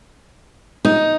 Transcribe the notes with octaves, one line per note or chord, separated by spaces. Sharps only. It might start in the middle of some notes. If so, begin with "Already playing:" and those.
D#4